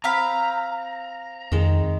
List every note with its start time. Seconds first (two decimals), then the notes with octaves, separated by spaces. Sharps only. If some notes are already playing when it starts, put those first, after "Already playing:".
0.04 C4 F5 A#5 B5
1.52 F2 D#3 G#3